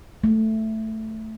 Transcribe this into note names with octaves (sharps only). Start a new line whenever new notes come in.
A3